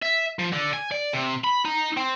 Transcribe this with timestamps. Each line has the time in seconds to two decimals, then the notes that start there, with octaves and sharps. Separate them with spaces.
0.02 E5
0.39 F3
0.53 D3
0.73 G#5
0.91 D5
1.13 C3
1.44 B5
1.65 D#4
1.97 C4